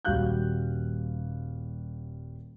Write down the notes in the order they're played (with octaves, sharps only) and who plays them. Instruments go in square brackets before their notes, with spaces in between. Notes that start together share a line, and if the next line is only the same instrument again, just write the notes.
[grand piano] D#1 G3 F#4 F5 F#6 G6